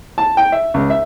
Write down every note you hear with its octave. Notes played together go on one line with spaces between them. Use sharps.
A5
G5
E5
C#2
E5